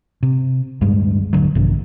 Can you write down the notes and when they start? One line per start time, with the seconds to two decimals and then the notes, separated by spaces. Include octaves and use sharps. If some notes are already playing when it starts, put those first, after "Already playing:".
0.23 C3
0.81 D1 G2 G3 G#3
1.33 D1 C2 D3 F#3
1.55 A#1 G2 C3 D#3